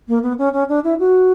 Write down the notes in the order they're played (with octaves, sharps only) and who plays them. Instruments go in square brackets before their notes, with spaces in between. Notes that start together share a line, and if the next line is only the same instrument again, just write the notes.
[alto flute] A#3
B3
C#4
C#4
D4
E4
F#4